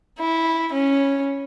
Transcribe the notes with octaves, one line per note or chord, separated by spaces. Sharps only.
E4
C#4